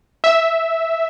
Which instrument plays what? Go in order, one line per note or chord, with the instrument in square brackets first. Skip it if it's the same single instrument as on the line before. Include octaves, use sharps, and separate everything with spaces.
[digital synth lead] E5